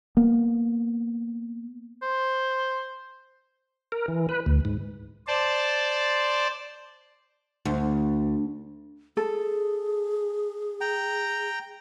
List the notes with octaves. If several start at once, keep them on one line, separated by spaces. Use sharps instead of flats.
A#3 B3
C5
A#4
E3
B4
D2
G#2
C5 D5 A5
D2
G#4 A4
G5 A#5